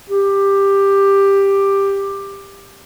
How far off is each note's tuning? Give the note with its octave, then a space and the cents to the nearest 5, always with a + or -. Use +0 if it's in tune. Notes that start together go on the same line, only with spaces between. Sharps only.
G4 +10